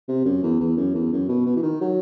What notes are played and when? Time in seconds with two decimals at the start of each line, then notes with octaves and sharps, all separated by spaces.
0.08 C3
0.25 F#2
0.43 E2
0.60 E2
0.77 F#2
0.95 E2
1.12 F#2
1.28 B2
1.46 B2
1.56 E3
1.63 D#3
1.81 F#3